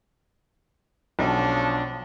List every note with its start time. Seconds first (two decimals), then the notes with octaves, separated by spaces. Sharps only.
1.19 B1 F3 C#4 D4